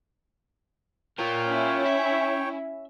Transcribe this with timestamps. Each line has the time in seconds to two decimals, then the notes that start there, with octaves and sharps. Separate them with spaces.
1.18 F4 A#4 C#5 G5
1.48 C#4 E4
1.86 E5